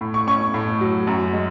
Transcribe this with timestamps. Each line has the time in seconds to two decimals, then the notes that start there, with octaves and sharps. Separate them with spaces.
0.01 A2
0.14 C#6
0.27 C#4 C#6
0.54 A2
0.81 F#3
1.07 F#2
1.33 G#3